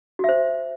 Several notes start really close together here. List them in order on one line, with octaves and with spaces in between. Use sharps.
F#4 E5 C5